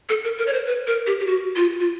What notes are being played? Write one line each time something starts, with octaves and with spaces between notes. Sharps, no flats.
A4
A#4
A#4
C#5
C5
B4
A#4
G4
G4
F#4
F4
F4